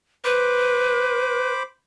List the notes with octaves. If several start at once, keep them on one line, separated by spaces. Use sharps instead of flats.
B4 C5 B5 D6